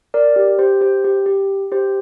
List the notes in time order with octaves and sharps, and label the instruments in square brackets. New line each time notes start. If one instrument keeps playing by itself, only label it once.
[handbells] A#4 D5
G4
G4 C5
G4 C5
G4
G4
G4 C5